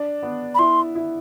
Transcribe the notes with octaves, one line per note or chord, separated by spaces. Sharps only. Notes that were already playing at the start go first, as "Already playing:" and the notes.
Already playing: D4
B3
B5
E4 C6
E4